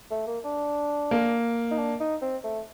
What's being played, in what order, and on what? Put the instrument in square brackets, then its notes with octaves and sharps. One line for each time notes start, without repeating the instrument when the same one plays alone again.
[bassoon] A3
A#3
D4
[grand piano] A#3
[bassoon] D#4
D4
D#4
C4
A3